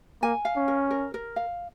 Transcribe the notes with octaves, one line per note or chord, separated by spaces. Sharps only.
A#3 G#5
F5
C#4
A#4
A#4
A#4
F5